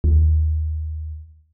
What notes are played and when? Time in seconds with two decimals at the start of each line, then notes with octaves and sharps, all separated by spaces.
0.04 D#2